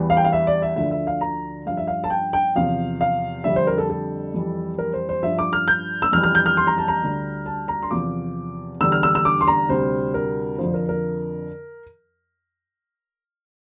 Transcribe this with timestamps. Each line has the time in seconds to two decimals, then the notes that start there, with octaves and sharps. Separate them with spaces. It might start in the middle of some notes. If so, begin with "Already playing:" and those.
Already playing: E2 E3 G3
0.10 F5
0.17 G5
0.24 F5
0.33 E5
0.47 D5
0.62 E5
0.76 D2 D3 F3 E5
0.91 E5
1.07 F5
1.21 A#5
1.66 G2 F3 F5
1.77 E5
1.87 F5
2.04 A5
2.10 G5
2.33 G5
2.55 E2 C3 F3 F5
3.01 F5
3.44 F2 D3 G3 E5
3.56 C5
3.67 A#4
3.78 A4
3.90 A4
4.34 F2 E3 G3
4.78 A#4
4.93 C5
5.09 C5
5.23 G2 F3 E5
5.39 D6
5.53 F6
5.68 G6
6.02 E6
6.12 F2 E3 G3 F6
6.23 F6
6.35 G6
6.46 F6
6.57 C6
6.67 A#5
6.78 A5
6.88 A#5
7.02 D2 D3 G3
7.46 A5
7.68 A#5
7.82 C6
7.91 E2 C3 F3 D6
8.81 E2 D3 G3 E6
8.92 F6
9.03 E6
9.15 E6
9.25 D6
9.41 C6
9.48 A#5
9.69 D2 C3 G3 C5
10.14 A#4
10.58 F2 D3 F3 C5
10.74 A#4
10.89 A#4